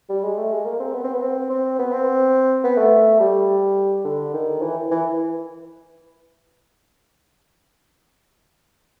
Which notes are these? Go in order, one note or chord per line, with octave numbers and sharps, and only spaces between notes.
G3
G#3
A3
G#3
A#3
C4
B3
C4
B3
C4
C4
B3
C4
B3
A3
G3
D3
D#3
E3
E3